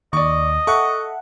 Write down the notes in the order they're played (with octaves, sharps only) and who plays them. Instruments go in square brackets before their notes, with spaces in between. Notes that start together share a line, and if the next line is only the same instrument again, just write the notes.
[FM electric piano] D#2 [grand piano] D5 C#6 [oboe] D#5
[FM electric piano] A4 E5 F#5 [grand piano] C#6